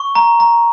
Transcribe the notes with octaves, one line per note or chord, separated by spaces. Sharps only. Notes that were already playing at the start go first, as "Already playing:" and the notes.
Already playing: C#6
A#5
A#5